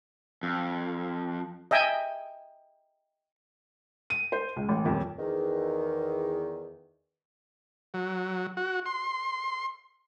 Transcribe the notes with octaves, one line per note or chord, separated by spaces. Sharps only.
F2
D#5 E5 G5 G#5
D#7
C5
C#2
A1
D#1 F2
E2 D#3
F#3
F#4
C6